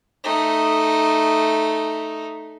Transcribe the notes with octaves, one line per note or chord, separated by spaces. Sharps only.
A3 D#4